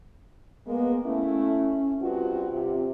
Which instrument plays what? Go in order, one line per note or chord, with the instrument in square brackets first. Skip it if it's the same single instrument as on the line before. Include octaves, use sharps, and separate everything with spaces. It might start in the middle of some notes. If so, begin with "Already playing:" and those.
[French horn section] G#3 A#3 [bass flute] B3
[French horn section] A3 E4 [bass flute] C#4
[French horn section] G2 C4 F#4 [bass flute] F4
[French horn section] C3